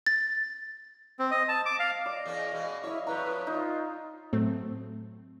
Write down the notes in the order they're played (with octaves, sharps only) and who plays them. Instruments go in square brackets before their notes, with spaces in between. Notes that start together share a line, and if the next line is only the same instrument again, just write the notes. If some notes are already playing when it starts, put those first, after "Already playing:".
[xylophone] A6
[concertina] C4
D#5
A5
D6
F5
[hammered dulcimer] D5 [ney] D#5
[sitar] E2 A#3 C#4
B2 G#3
[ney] E4 [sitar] C#5 [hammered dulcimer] D#5 F5
[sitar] F2 A2 C#5 [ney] B4 [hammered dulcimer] A#5
[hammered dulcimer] D#4 [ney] F4
[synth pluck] A2 F#3 A3 C4